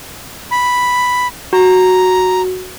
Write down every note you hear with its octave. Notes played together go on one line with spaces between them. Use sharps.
B5
F#4 A#5